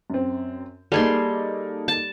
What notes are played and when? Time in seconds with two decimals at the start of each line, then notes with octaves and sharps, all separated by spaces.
0.10 F#2 C4
0.92 G3 A#3 D#4 G#4 A4 C6
1.88 A5